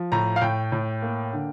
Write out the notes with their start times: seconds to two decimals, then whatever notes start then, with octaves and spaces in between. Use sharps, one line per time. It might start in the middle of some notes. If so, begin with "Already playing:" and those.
Already playing: F3
0.12 A2 A#5
0.36 F5
0.41 A2 G5
0.72 A2
1.02 A#3
1.33 D3